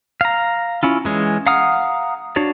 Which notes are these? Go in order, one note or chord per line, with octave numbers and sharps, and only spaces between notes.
F5 A#5
C#4 E4 F4
E3 G#3 C#4
F5 F#5 A#5 D#6 F6
D4 F#4 C#5 D5